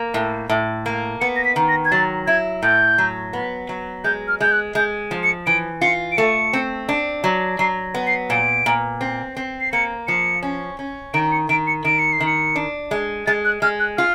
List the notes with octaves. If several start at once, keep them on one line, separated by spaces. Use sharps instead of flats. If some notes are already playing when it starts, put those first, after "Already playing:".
Already playing: A#3
A2
A2
A#3
B3 C#7
A#6
B6
D#3
A#6
G#6
F#3 A6
E4 G#6
A2 G6
F#3
B3
F#3
G#3 G6
F6
G#3 G6
F#6
G#3 G6
F3
C#7
E3 D7
F4 C#7
D7
A3 C#7
C4
D4
F#3
F#3 C7
B3
C7
A#2 D7
A#2
C4
C4
C7
A#3 C#7
F3 C#7
C#4
C#4
D#3 D7
C#7
D#3 D7
C#7
D#3 D7
C#7
C7
D#3
C#7
D4
G#3
G#3 A6
F#6
G#3 F6
F#6
F4 F6